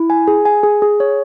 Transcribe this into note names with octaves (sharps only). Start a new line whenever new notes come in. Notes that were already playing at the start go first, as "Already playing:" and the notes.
Already playing: E4
G#5
G#4
G#5
G#4
G#4
C#5